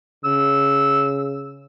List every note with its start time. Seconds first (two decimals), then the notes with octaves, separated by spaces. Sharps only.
0.25 C#3 E6